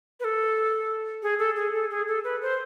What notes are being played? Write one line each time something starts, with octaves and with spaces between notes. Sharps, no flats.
B4
A4
G#4
A4
G#4
A4
G#4
A4
B4
C5